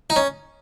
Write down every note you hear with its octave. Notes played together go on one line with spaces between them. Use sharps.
D#4
C#4